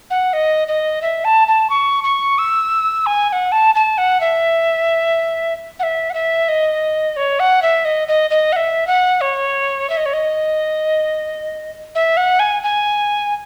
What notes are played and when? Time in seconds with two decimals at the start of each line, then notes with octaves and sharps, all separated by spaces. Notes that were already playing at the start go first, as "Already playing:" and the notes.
0.10 F#5
0.33 D#5
0.68 D#5
1.02 E5
1.24 A5
1.47 A5
1.70 C#6
2.04 C#6
2.38 E6
3.06 G#5
3.29 G#5
3.32 F#5
3.52 A5
3.75 A5
3.98 F#5
4.21 E5
5.79 F#5
5.83 E5
6.10 F#5
6.14 E5
6.48 D#5
7.16 C#5
7.40 F#5
7.62 E5
7.85 D#5
8.08 D#5
8.30 D#5
8.52 F#5
8.56 E5
8.87 F#5
9.21 C#5
9.90 E5
9.97 D#5
10.06 C#5
10.13 D#5
11.95 E5
12.17 F#5
12.39 G#5
12.63 G#5